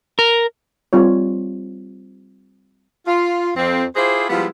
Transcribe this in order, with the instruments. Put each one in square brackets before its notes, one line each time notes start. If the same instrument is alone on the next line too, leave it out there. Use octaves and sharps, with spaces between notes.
[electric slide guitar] A#4
[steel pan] G3 C4 F4 C#5
[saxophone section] F4
F2 C4
E4 F4 G4 G#4 C5
F3 G3 G#3 B3 E4 F4